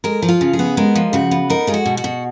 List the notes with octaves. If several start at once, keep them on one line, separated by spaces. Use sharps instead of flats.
G#3 A#4
F3
F4
C#3
G#4
B3
G#3 A#4
F3
C#3 F#4
B3
D#4 A#4
G#3 F4
F#4
B2
F#4
B2